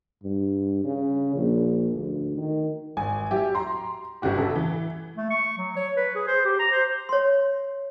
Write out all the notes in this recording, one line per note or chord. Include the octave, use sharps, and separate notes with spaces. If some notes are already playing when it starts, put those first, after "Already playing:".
G2
C#3
A#1
D2
D#3
G#1 G#5
F#3 E4 G4
A#5 C6
G1 C#3 F#4 G4
C#3 A4
E3
A3
C#6
F#3
C#5
B4
G#4
C5
G4
A#5
C5
C#5 C6